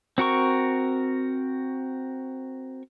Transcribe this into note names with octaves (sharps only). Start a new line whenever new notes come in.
C4 F#4 A#4 C#6